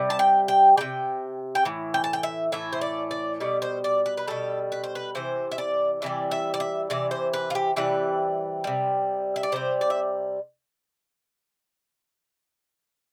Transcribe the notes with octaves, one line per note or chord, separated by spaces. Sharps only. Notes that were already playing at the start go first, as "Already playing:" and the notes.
Already playing: C3 G3
A5
G5
G5
C3 G3 G5
G5
A2 E3
G5
A5
G5
E5
A2 E3 A3 E5
C5
D5
D5
B2 G3 D5
C5
D5
B4
B4
B2 G3 A4
B4
C5
B4
C3 E3 C5
E5
D5
C3 E3 G3 D5
E5
D5
E5
C3 E3 D5
C5
B4
F4
G4
C3 E3 G3 B4
C3 G3
E5
D5
C3 G3 C5
D5
E5